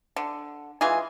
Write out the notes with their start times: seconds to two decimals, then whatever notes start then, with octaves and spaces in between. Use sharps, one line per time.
0.16 D3
0.81 E3 G#3 F4 G#4